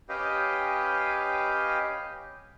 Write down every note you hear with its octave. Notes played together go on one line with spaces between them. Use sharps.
C#4 G4 B4 D#5 F5 G5